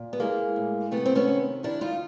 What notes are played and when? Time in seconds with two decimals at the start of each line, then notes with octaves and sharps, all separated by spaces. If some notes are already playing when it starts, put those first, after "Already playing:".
Already playing: A#2
0.13 B3
0.20 E3 G#3 A#3
0.56 A2
0.91 C3 A3 B3
1.06 C4
1.16 B3 C#4
1.28 D#3
1.63 D#3 D4 E4
1.81 D#4 F4